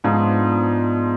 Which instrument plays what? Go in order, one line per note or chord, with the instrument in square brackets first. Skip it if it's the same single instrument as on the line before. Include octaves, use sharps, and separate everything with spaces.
[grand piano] G#2 [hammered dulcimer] F3 B3 D4 F4